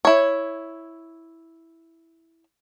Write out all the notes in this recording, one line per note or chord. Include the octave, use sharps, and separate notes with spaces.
E4 C#5